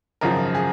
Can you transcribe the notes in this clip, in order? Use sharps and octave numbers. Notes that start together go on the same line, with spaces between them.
G#1 F#2 C#3 F3 A#4
G#4